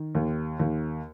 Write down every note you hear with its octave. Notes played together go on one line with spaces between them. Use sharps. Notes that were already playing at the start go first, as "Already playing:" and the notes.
Already playing: D#3
D#2
D#2